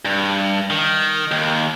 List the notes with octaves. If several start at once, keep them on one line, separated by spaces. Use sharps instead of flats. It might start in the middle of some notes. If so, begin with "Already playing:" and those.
G2
D#3
D#2